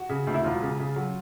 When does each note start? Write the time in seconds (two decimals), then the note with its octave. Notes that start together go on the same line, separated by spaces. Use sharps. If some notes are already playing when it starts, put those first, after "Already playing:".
Already playing: F#4
0.09 C#3
0.27 D2
0.34 E4
0.44 E1 F4
0.62 C#3
0.79 C#3
0.96 F#3